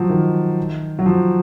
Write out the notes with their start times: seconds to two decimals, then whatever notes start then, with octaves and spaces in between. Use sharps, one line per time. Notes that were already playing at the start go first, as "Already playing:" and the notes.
Already playing: F3 F#3
0.10 D#3
0.99 F#3
1.06 F3